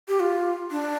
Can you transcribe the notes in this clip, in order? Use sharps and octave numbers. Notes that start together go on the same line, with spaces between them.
G4
F4
D4